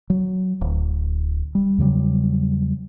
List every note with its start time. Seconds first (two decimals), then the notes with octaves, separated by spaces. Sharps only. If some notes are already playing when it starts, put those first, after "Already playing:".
0.10 F#3
0.61 D1
1.55 G3
1.78 E2 C#3 F#3 G3